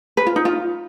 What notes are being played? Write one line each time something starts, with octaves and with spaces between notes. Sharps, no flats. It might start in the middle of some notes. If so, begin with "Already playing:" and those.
B4
F4
D#4
F4